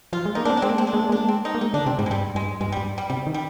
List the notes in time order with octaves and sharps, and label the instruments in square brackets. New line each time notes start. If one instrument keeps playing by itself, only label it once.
[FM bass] F3 [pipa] F4
[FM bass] G#3
[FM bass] A#3 [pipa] D#4
[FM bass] A#3 [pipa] D4
[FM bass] C4
[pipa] D4
[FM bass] G#3 [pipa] C4
[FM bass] A#3
[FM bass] G#3 [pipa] C4
[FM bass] A#3 [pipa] D4
[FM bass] G#3
A#3
G#3
[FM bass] A#3 [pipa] D4
[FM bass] G#3 [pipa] C4
[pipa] D#4
[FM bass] A#3
[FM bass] G#3 [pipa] D#4
[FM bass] D3 [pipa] D4
[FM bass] C3 [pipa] C4
[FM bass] G#2 [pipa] G3
[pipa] G#3
[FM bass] G2 [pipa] G3
[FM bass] G2 [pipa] G#3
[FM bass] G2 [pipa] G#3
[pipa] G3
[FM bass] G2
[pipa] G3
[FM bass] C3 [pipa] G3
[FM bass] D#3
[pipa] G3